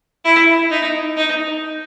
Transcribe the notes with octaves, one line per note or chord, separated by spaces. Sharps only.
E4
D#4
D#4